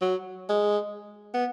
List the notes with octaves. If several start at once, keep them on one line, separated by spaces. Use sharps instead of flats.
F#3
G#3
B3